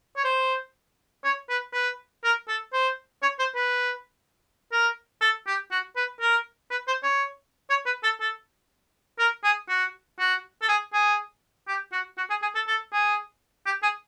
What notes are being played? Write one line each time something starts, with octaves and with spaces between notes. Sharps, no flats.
C#5
C5
C#5
B4
B4
A#4
A4
C5
C#5
C5
B4
A#4
A4
G4
F#4
B4
A#4
B4
C5
C#5
C#5
B4
A4
A4
A#4
G#4
F#4
F#4
A4
G#4
G#4
G4
F#4
F#4
G#4
G#4
A4
A4
G#4
G4
G#4